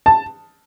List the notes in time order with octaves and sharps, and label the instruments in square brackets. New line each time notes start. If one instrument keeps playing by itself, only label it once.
[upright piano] A5